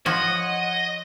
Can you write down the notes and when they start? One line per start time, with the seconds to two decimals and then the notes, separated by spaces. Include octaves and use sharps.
0.06 F3 C#5 D#5 F#5